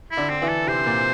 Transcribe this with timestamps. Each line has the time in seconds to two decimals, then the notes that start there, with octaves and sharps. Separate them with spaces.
0.11 E4
0.17 D3 D4
0.30 C4
0.42 E3 E4
0.49 A4
0.67 C3 C4 C5
0.86 A#2 A#3